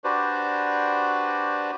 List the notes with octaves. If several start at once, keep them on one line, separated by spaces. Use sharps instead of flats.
D4 F#4 G4 B4 C5 D5